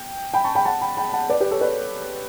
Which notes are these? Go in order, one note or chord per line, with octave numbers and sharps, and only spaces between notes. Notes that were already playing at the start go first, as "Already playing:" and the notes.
Already playing: G5
G5 B5
A5 C#6
G5 B5
F#5 A5
G5 B5
G5 B5
F#5 A5
B4 D5
G4 B4
A4 C#5
B4 D5